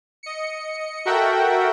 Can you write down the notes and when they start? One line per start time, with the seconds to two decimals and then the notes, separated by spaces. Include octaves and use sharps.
0.23 D#5 C#7
1.05 F#4 A4 A#4 E5 F#5 G5